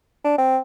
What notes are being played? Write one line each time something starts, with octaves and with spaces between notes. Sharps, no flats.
D4
C4